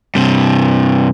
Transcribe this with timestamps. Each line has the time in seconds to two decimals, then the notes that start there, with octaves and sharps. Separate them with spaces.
0.15 G2 C3